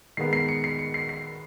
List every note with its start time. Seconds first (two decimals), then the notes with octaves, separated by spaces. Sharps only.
0.17 D#3 G#3 B3 C7
0.33 C7
0.48 C#7
0.64 C7
0.79 C#7
0.94 C7
1.09 C7